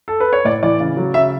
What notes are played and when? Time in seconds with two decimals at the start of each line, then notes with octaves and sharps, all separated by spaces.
0.08 A4
0.20 B4
0.33 C#5
0.45 A2 D5
0.63 E3 D5
0.80 C#3
0.97 F#3
1.14 C#3 E5